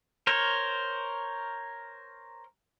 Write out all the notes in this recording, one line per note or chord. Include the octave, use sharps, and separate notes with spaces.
A#4 C5 C#5